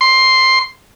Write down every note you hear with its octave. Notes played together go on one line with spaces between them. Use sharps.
C6